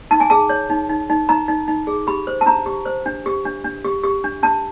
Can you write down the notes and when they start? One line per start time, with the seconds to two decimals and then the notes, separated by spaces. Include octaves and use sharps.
0.11 D#4 A5
0.20 G#5
0.30 G#4 A5
0.49 C#5
0.70 D#4
0.89 D#4
1.09 D#4
1.29 D#4 A#5
1.48 D#4
1.68 D#4
1.87 G#4
2.07 G4 B5
2.27 C5
2.41 A5
2.46 D4 A#5
2.66 G4
2.86 C5
3.06 D4
3.26 G4
3.45 D4
3.65 D4
3.85 G4
4.03 G4
4.24 D4
4.43 D4 A5